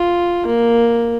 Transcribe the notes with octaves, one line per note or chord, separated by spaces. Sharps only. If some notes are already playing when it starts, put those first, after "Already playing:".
Already playing: F4
A#3